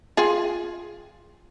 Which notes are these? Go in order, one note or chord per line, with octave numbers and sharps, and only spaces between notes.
F4 G#4 G5